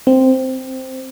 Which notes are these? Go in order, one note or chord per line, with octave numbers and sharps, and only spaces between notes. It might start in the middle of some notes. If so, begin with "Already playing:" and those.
C4